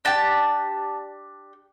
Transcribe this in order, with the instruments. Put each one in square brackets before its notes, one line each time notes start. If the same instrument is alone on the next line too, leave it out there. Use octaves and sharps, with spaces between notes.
[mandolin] D4 G4 A5